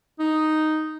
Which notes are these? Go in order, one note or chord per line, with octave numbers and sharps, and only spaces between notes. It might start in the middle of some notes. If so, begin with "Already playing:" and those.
D#4